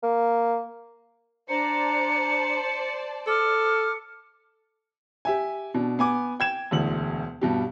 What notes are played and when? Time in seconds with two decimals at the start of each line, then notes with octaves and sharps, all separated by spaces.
0.03 A#3
1.49 D4 C5 D5 A5 A#5 C#7
3.27 A4 D6 F6 C#7
5.25 G4 E5 G#5
5.74 B2 D4
5.99 B3 G#5 D6
6.40 G5 G#6 E7
6.71 E1 D2 F#7
7.41 G2 B2 G4